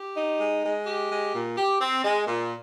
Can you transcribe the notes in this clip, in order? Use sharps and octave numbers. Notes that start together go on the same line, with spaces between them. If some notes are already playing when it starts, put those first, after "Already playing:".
Already playing: G4
D#4
G#3
G#3
G4
G#3
A#2
G4
C4
G#3
A#2